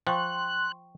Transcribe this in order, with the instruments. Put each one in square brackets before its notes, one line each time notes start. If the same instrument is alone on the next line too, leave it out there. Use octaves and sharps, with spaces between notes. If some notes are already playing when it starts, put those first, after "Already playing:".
[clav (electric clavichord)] F3 [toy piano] G5 C#6 [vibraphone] C6 [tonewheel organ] F#6